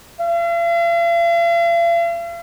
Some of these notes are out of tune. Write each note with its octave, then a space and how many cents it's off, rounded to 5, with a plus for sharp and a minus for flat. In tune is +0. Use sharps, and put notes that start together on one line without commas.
F5 -45